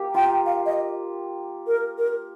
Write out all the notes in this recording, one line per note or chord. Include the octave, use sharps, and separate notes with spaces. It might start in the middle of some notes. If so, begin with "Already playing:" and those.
Already playing: A#3 G4
F4 G5
F5
D#5
A#4
A#4